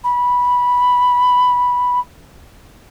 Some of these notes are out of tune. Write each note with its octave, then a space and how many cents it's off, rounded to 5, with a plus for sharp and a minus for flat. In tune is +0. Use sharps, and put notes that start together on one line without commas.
B5 -10